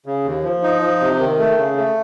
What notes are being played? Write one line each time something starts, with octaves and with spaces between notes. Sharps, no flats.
C#3
D#2
F3
D#4
F3
C3
D#3
A3
C#3
A3